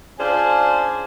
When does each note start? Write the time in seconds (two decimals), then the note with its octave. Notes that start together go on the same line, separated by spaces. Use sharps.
0.18 C#4 D4 F4 G#4 C5